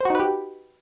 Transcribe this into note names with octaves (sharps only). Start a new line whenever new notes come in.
D#4 F#4 G4 B4 C5